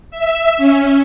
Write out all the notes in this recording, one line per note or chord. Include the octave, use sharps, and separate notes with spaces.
E5
C#4